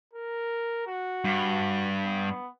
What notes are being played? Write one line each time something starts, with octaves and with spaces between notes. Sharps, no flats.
A#4
F#4
G2
B3